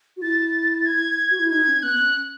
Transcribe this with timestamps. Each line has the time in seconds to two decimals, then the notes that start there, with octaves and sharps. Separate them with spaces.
0.17 F#4
0.22 E4 A6
0.86 G#6
1.31 F#4
1.40 E4
1.50 D#4 G#6
1.67 C#4
1.82 B3 F#6
1.99 C#4